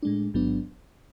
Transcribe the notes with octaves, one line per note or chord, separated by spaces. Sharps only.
A2 G#3 D4
A1 G#2 F#3 B3 D4